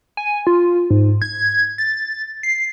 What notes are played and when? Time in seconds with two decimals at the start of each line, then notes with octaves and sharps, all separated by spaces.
0.17 G#5
0.47 F4
0.90 G#2
1.22 G#6
1.78 A6
2.43 C7